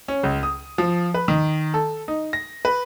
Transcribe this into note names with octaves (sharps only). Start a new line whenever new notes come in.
C#4
C#2
D#6
F3
B4
D#3
A4
D#4
A#6
B4